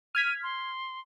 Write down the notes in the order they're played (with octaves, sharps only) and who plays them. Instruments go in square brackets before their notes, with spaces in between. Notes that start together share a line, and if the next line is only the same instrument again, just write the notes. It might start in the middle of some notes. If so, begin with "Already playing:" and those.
[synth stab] F6 G#6 B6 [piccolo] D#7
[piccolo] C6